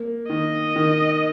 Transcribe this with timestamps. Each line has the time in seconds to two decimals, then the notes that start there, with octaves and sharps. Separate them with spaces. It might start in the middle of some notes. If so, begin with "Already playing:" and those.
Already playing: A#3
0.29 D#3 D#5
0.76 D#3